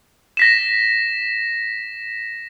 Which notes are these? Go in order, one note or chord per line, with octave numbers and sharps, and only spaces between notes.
A#6 B6 E7